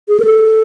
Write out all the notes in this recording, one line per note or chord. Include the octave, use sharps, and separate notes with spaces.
G#4
A#4
A4